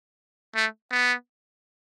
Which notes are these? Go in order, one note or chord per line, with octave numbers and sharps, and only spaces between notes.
A3
B3